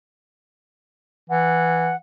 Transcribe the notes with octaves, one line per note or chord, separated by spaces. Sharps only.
E3 F#5